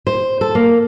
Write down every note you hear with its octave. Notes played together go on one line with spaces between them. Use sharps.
C5
A4
A#3